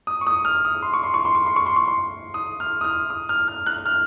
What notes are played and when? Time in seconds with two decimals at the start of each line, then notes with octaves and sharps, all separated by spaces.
0.07 D#6
0.21 C#6
0.27 D#6
0.45 F6
0.65 D#6
0.83 C6
0.94 C#6
1.03 C6
1.14 C#6
1.25 C6
1.35 C#6
1.46 C6
1.56 C#6
1.66 C6
1.76 C#6
1.88 C6
2.34 D#6
2.60 F6
2.81 D#6
2.84 F6
3.10 D#6
3.29 F6
3.48 F6
3.66 F#6
3.86 F6